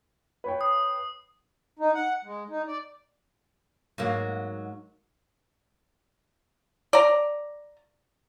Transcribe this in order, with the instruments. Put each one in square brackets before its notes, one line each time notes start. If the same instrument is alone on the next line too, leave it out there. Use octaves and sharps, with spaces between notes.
[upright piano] B4 C#5 G5
[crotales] D#6
[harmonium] D#4
F#5
G#3
D#4
D5
[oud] G#2 F#3 A#3
[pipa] D5 A#5